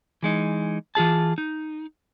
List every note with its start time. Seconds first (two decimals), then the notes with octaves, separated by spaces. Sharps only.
0.23 E3 G#3 D#4
0.95 E3 F4 G#4 A5
1.38 D#4